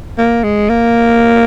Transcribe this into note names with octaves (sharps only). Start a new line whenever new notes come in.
A#3
G#3
A#3